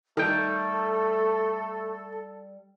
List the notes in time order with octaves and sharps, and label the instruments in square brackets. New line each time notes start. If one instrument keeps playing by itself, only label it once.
[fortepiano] D#3 [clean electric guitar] G3 G5 [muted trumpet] A3 [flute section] A4